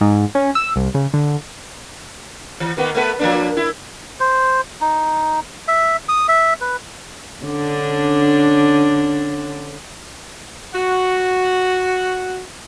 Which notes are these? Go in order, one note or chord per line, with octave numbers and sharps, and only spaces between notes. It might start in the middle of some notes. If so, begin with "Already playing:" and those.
G#2
C#4
E6
C2
C#3
D3
E3
D#3 A#3 B3
A3 B3 B4
F3 A#3 D4
E4
C5
D#4
E5
D#6
E5
B4
D3 C#4 D4
F#4 F#5